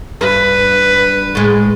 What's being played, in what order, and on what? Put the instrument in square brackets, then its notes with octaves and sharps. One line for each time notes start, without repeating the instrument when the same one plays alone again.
[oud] G2 [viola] B4
[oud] A2 G#3